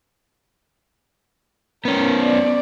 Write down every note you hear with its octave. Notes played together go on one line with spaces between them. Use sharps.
B3 C#4 A#4
D5